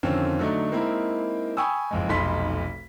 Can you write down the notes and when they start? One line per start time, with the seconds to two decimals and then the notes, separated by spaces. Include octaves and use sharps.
0.03 F2 D3 D#3 C4 C#4
0.39 D3 F#3 A3 D4 D#4
0.71 G#3 A#3 C4 D#4 E4 A#4
1.57 G5 G#5 B5 C#6 D#6 E6
1.91 F#1 F2 G#3
2.09 F1 B1 D#4 B5 C6 B6